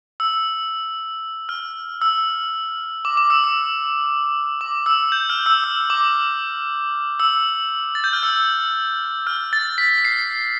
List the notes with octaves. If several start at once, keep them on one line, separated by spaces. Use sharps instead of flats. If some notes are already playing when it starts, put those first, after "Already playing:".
E6
F6
E6
D6
D6
E6
E6
D6
E6
G6
F6
E6
E6
D6
E6
A6
G6
F6
E6
F6
A6
B6
B6
C7